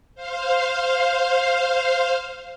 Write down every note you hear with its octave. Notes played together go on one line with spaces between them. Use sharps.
C5 F5